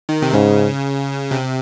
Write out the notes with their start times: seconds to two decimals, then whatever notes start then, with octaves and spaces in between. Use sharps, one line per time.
0.09 D#3
0.22 C3
0.33 G#2 C#3
1.31 C3